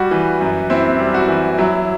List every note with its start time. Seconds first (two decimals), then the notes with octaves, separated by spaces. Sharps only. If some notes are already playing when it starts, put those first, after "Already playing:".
Already playing: G3 F#4
0.11 E3
0.40 F#2
0.70 C4 E4
0.99 G3
1.14 F#4
1.28 E3
1.58 F#3 E4